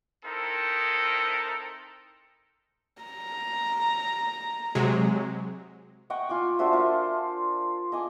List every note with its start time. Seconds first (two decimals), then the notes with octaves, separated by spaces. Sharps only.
0.25 C4 D#4 E4 A4 A#4
3.02 A#5
4.75 C3 F#3 G#3
6.10 D#5 F#5 G5 C#6
6.29 F4 G#5 D6
6.59 D4 F#4 C5 E5
6.73 F4 A#4
7.92 D#5 G#5 D6